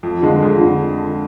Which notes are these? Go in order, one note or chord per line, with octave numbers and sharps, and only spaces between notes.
F2
D3 F3 G#3
F2
D3